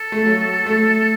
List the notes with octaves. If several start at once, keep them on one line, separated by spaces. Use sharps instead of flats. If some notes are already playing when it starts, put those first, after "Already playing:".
Already playing: A4
A3
F#3
A3